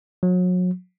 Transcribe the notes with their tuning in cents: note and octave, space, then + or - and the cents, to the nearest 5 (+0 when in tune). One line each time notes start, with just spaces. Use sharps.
F#3 -35